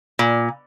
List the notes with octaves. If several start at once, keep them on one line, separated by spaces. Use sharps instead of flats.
A#2